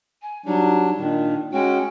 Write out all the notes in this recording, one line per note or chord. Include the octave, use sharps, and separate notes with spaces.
G#5
F#3 G3 D4 D#4
A#2 D#3 D4
G#3 C#4 F#4 G5